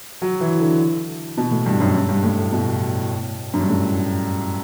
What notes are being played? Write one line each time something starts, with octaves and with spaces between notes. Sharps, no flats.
F#3
E3
D3
B2
A2
G2
F#2
G2
G2
A2
A2
B2
F#2
G2
A2